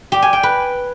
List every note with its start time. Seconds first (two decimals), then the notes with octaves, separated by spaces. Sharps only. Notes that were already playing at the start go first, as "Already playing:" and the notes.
0.12 G4
0.22 G#5
0.33 G5
0.43 B4